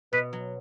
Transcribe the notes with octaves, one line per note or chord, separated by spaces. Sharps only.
B2 B4
F#3